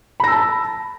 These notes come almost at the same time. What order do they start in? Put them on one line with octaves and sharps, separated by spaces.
B5 A#6 E6 A5